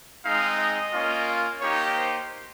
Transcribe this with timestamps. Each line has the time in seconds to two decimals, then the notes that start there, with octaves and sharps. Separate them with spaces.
0.23 G#3 C4 D#4 F5
0.58 D#5
0.92 A#3 C#4 F4
1.60 A#3 D#4 G4 C#5
1.95 C5